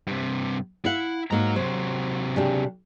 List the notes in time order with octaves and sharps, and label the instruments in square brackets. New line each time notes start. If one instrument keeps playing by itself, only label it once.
[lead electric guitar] G2 C3
[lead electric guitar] E4 [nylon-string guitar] F5 F#5
[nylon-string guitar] G#2 A#3 [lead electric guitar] F#4 A#5
[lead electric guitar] C3 F#3 [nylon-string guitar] C5
[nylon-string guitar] C#3 D4 G4